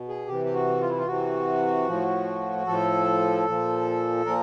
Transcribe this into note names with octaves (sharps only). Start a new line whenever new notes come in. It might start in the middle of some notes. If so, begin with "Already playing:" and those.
Already playing: B2
G#4
C3 E3 G4
G4
F#4
F4
E4
F4
C3 E3 F#4
A2 F3
A2 F3 A4
A#2 F3
A#2 F3 A#4